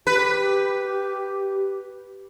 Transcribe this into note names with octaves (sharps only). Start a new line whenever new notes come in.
G4 B4